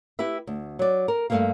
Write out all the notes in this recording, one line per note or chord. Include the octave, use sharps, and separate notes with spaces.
E4 G4 B4 E5
D2
F#3 D5
A#4
G2 A#2 A3 A#3 F5